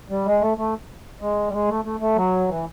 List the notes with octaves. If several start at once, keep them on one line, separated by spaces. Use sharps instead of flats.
G3
G#3
A3
A3
G#3
G3
G#3
A3
A3
A3
F#3
E3